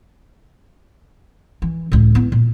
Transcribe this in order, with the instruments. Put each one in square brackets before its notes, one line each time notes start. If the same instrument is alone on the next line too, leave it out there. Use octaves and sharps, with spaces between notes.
[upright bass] E3
C#2 A2
B3 E4
A#2